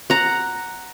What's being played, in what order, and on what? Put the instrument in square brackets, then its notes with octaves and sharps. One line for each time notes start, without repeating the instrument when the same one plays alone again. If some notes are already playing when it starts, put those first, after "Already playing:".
[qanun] F#5 A#5